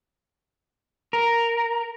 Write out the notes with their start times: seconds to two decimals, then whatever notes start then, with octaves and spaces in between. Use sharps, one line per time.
1.13 A#4